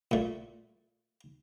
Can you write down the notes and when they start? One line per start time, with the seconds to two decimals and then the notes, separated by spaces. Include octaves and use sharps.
0.11 A#2 A3